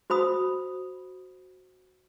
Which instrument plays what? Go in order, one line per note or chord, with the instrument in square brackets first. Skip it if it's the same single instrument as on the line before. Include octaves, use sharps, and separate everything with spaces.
[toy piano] F#4 C5 B5 D#6